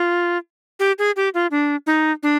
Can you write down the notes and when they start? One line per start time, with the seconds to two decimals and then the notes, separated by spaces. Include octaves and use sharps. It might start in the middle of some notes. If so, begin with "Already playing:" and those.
Already playing: F4
0.80 G4
0.99 G#4
1.16 G4
1.34 F4
1.51 D4
1.87 D#4
2.23 D4